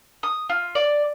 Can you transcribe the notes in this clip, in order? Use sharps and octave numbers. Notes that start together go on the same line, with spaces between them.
D#6
F4
D5